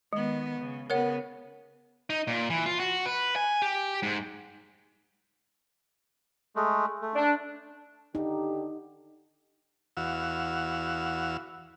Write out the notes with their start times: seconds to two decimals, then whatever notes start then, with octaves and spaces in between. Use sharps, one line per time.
0.13 D#3 G#3 B3
0.60 C#3
0.90 C#3 B3 A#4 C#5 F#5
2.10 D#4
2.27 A#2
2.50 E3
2.66 F4
2.80 F#4
3.06 B4
3.36 G#5
3.62 G4
4.03 G#2
6.56 G#3 A3
7.02 A3
7.15 D4
8.15 D3 D#4 G4
9.97 E2 F#4 F5 E6